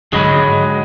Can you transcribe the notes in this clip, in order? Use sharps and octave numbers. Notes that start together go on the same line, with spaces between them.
G#2 D3 F#3 G#3 G#4 D#5 B5